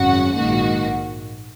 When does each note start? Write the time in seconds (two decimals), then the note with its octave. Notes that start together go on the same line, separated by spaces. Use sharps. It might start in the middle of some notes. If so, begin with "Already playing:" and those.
Already playing: G#1 F#2 C#3 F#4 F#5
0.35 A#1 G#2 D#3 A#3 F#4 F#5